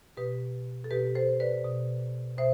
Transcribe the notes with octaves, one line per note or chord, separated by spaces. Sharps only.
B2 G4 B4
A4
B2 G4 B4
A4 C5
B4 D5
B2
B2 C5 E5